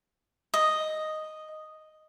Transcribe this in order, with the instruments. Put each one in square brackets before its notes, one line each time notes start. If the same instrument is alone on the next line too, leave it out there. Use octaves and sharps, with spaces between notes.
[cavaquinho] D#5